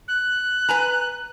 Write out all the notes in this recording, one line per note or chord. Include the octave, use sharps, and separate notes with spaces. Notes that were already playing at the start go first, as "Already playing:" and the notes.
F#6
B4 G#5 A#5